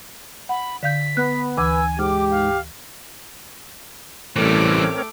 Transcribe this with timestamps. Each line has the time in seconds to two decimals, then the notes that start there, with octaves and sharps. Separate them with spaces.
0.49 F#5 B5
0.83 D3 F5 G6 B6
1.17 B3 B4 F#6
1.58 D2 E3 G#5 D6 E6
1.99 G#2 G4 D6 F6
2.31 F5
4.36 A1 E3 G3 A3 C4 A#4 C#5 D6